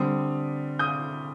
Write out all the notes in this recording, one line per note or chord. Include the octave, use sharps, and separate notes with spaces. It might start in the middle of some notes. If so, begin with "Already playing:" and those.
Already playing: D3 G3 C4 D#6
D#6 G6